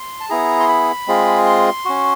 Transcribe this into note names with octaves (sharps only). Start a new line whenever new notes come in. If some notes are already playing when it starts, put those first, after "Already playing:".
Already playing: C6
A5
B3 E4 G#4 A#5
C6
B5
G#3 C4 F4 G#4
C6
C#4 F#4